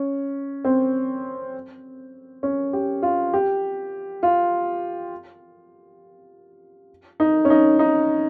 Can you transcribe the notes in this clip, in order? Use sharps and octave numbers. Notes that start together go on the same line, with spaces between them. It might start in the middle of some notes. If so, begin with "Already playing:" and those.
Already playing: C#4
C4
C#4
G4
F4
G4
F4
D#4
C#4
D#4
D#4